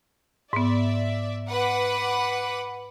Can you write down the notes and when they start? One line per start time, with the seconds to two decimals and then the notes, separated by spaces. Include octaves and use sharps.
0.53 G#2 B3 D5 E5
1.49 B4 F#5 D6